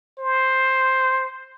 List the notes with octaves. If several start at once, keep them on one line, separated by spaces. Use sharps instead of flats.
C5